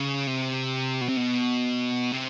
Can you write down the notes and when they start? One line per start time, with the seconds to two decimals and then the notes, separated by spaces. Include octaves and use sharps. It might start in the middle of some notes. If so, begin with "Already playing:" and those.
Already playing: C#3
0.27 C3
1.01 B2
1.09 C3
1.17 B2
2.12 C3